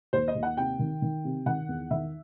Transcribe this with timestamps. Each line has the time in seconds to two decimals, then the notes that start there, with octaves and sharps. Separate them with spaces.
0.13 D#2 C5
0.28 D#5
0.35 D#2
0.43 F#5
0.57 C3 G5
0.79 D#3
1.02 D#3
1.24 C3
1.46 D#3 F#5
1.69 E2
1.91 D#3 E5